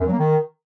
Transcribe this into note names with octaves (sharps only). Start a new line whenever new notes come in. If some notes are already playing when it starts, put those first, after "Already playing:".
F#2
F#3
A#3
D#3